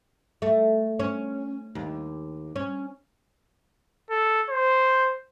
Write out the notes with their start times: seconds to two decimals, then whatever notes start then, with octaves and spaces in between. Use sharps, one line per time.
0.42 A3
0.99 C#4
1.75 D#2
2.56 C#4
4.10 A4
4.50 C5